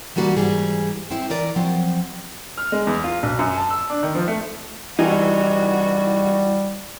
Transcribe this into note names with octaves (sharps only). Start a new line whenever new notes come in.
D3 E3 G3 A#3 F#4
G#2 E3 G3 G#4
C4 E4
E3 A#4 D5
F3 F#3 C4
F6
G#3
E2
F4
B1
F#2
A5
E6
D4
D#3
F3
A3
C2 G2 E3 G3 D#4 F#4